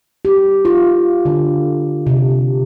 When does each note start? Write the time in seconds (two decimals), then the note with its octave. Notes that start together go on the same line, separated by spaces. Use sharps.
0.25 G4
0.65 F4
1.25 D3
2.07 C3